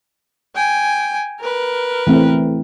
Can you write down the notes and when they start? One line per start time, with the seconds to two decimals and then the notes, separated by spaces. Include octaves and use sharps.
0.55 G5 G#5
1.41 A#4 B4
2.07 E3 A3 C4